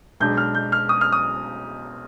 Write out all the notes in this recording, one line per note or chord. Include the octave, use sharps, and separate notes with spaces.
B1 B2 G#3 D4 G6
F6
G6
F6
D#6
F6
D#6